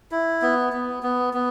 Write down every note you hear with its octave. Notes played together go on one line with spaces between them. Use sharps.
E4
B3
B3
B3
B3